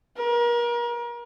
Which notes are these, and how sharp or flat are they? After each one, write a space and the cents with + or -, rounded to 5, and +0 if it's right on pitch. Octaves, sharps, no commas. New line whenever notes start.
A#4 +35